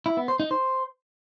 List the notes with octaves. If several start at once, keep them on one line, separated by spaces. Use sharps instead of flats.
E4
B3
C5
D#4
C5